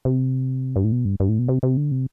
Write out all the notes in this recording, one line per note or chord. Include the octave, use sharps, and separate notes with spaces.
C3
G2
A2
B2
G2
G2
A2
B2
C3
C3
D3
C3